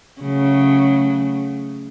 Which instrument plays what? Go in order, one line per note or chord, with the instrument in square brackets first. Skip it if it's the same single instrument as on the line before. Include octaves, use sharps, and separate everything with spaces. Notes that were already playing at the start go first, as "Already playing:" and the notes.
[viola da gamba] C#3 F#3 A3